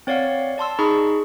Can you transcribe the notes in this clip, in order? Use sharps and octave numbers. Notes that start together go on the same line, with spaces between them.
C4 C#5 D5 F5 F#5
D5 A5 C6 E6
D#4 G#4 B5 C#6